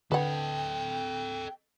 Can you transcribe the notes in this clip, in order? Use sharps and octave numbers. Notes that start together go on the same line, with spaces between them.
D3 A4 B4 D#5 F#5 G5